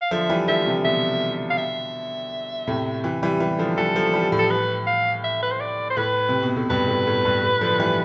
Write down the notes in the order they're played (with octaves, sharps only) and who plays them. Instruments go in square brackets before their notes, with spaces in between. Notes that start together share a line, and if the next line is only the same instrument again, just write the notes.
[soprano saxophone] F5
[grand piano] D3 F3 [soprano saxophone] E5
[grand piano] E3 G3
[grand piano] D3 F3 [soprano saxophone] E5
[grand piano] C3 E3
[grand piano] B2 D3 [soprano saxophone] E5
[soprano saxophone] F5
E5
[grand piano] A2 C3
C3 E3
E3 G3
E3 G3
D3 F3
[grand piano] E3 G3 [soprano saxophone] A4
[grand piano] F3 A3
E3 G3
A2
[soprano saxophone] A4
B4
F5
E5
B4
C5
D5
C5
[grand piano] A2 [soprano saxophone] B4
[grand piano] C3
B2
A2
[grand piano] G2 [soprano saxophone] B4
[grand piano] A2
A2
G2
A2
D3 F3
E3 G3